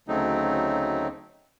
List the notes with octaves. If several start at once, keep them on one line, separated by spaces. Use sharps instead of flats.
D2 C#3 F#3 A3 C4 D#4